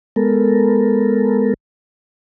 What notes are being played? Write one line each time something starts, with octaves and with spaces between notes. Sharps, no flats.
G#3 B3 A4 A#4